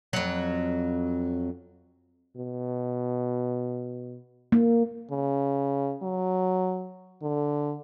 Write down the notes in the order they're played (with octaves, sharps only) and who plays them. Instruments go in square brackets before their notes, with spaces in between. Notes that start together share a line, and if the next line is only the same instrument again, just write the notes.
[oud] F2 F#3
[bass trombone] B2
[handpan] A#3
[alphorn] C#3
F#3
D3